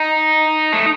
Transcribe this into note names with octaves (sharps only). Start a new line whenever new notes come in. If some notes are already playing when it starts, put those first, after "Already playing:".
Already playing: D#4
A3